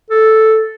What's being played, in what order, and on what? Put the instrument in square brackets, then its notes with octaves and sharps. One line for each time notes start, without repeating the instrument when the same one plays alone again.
[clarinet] A4